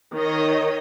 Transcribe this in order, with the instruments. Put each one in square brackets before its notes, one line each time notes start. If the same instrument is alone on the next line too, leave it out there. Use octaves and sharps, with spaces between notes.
[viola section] D#3 C#5 D#5